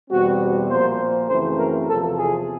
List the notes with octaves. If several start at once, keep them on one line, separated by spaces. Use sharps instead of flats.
E2 B2 G3 C4 F#4
A#2 F3 A#3 C5
F#2 C#3 E3 A3 C4 C5
A#4
E2 C3 F3 A4
G#4